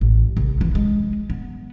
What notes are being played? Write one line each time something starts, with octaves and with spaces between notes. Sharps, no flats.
A1
C2
E3
G#3
B3